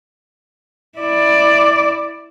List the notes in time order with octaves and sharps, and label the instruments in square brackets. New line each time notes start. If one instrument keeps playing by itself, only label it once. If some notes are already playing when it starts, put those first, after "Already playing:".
[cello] E4 D5